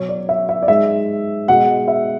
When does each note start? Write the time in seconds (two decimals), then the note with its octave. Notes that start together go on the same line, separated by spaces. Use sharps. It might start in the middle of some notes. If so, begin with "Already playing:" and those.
Already playing: B2 F#3 C#5
0.09 D5
0.29 E5
0.49 E5
0.62 D5
0.68 G#2 G#3 E5
1.48 B2 G#3 F#5
1.88 E5